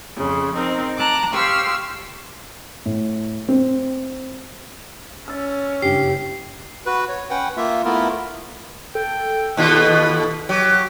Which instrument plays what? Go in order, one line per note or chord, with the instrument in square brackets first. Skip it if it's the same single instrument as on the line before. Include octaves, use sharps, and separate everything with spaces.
[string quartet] F2 C#3
C4 D#4 A#4
A5 A#5 D6 F#6
G4 C5 F5 C#6 E6 F6
[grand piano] A2
C4
[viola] C#4 [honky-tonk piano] E6 A6
[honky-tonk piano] F#1 G2 [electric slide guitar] G4 [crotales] C7
[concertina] F#4 B4
C#5
C#4 B4 F#5 G5
A#3 F4 E5
A3 B3 E4 F4 A#4
[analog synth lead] A4 [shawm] G5
[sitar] D#2 B2 F4 [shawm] B4
[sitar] F#3 [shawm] G4